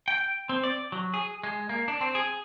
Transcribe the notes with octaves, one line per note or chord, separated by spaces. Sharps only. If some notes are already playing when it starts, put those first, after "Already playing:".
G5
C4
D5
F#3
G#4
G#3
A#3
D4
C4
G#4